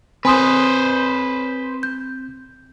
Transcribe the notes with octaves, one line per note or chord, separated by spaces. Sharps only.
C4 B4 C5 G#5 C6 D#6
G6